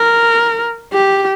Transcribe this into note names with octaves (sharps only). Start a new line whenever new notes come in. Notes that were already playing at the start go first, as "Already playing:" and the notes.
Already playing: A#4
G4